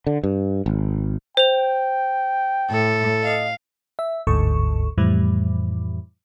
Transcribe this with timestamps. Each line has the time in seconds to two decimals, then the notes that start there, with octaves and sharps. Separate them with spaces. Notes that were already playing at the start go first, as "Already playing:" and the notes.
0.07 D3
0.23 G2
0.66 G#1
1.37 C5 G5 F7
2.71 A2 A4
3.24 D#5 F5
3.99 E5
4.27 G1 D2 G#2 A4 C#6
4.98 F2 A2 E3 G3